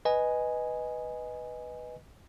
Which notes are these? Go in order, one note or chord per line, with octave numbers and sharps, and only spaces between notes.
B4 D#5 G#5